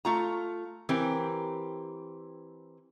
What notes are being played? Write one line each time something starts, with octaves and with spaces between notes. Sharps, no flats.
A3 F4 A#5
E3 C4 G4 A#4